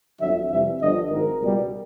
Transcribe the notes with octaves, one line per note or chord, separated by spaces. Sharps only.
G1 F2 D3 F#3 E5
F2 C3 E3 G3 E5
G1 G2 D3 F3 D#5
G#1 G#2 D#3 A#4
C#2 B2 G3